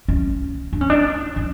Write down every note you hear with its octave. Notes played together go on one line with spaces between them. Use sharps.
C#4
D4
C#4
D4
C#4